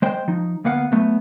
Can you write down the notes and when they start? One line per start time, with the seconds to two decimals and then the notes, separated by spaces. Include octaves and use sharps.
0.02 G#3 C5 G5
0.28 F3 D#4
0.64 D2 A#3 B3 F5 F#5
0.92 F#3 A3 B3